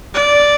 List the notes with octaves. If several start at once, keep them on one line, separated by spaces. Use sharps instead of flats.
D5